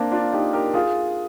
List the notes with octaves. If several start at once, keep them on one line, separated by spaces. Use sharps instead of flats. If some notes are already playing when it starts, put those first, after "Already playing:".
Already playing: A#3 C4 D4
D4 F4
D#4 G4
G4 A#4
F4 G#4